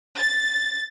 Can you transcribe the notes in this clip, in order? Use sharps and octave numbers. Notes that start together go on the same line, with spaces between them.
A6